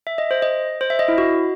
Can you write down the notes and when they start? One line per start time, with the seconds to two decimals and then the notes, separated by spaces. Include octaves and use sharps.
0.07 E5
0.18 D#5
0.31 C5
0.42 D#5
0.81 C5
0.90 E5
0.99 D#5
1.08 E4
1.18 F#4